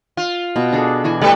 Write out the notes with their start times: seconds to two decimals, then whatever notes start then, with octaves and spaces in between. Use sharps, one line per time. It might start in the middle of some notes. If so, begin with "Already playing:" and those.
0.17 F4
0.56 B2
0.72 D4 G#4 A4
1.04 E3 F#4 G#5
1.21 G3 A3 A4 B4 D5